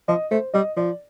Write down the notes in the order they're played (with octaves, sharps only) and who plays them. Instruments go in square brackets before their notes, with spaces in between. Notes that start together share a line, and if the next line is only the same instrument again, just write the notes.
[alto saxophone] F3 [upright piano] D#5
[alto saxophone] A3 [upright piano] C5
[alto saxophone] G3 [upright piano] D#5
[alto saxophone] F3 [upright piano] D5